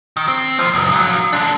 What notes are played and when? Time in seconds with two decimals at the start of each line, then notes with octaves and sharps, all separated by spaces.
0.17 D#3
0.28 C4
0.59 D#2 F3
0.74 C#2 F#2
0.91 F3 F#3
1.33 G#3 D4